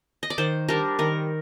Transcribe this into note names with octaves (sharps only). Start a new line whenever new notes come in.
D#5
D5
D#3 C5
G3 D4 A#4
D#3 A#4